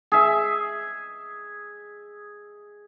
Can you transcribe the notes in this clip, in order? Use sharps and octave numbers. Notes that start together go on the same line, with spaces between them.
G#4 E5